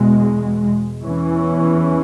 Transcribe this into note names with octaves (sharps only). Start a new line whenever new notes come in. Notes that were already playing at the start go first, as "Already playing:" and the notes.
Already playing: E2 B2 G#3
E2 E3 C#4